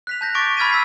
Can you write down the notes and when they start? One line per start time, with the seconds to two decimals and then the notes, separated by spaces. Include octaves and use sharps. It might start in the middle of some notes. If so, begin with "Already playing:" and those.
0.07 F#6 B6 F7
0.21 A5 G6 A#6
0.35 C#6 D6 A6 B6 D7
0.57 B5 F6 G#6 A6 B6 D#7
0.71 E6 B6 C7